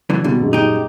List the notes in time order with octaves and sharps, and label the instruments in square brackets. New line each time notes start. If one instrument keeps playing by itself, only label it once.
[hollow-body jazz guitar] F#2 D3 E3
[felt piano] B2 G3 [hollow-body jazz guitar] D3
[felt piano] D#1 F#2 G#3
[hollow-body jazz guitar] D#4 G4